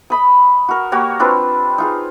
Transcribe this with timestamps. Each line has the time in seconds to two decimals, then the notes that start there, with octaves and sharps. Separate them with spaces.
0.10 D#5 B5 D#6
0.68 F#4 A#4
0.92 A#3 F#4 G4 C#5
1.20 C4 D4 F4 B4
1.78 D#4 F4 G#4